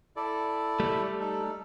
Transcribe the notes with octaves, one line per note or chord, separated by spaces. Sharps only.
E4 A4 D5
G3 A3
D#4 A4